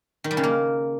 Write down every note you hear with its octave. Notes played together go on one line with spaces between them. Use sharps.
D#3
G3
C#3
A#3